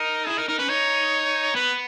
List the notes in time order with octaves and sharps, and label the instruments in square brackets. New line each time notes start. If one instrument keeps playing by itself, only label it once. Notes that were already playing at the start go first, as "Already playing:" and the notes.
Already playing: [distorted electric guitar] D#4 [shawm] A#4
[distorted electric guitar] E4 [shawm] G#4
[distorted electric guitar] D#4 [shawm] A#4
[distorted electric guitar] D#4 [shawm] A#4
[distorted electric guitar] C#4 [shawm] B4
[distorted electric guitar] D#4 [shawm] C#5
[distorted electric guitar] B3 [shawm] B4